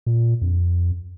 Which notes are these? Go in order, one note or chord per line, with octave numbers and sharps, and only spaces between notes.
A#2
F2